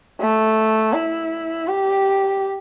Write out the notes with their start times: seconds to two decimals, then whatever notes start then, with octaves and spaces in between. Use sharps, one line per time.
0.20 A3
0.93 E4
1.67 G4